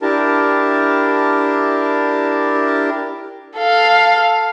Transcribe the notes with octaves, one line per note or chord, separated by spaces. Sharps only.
D4 E4 G4 A#4 A5
A4 F5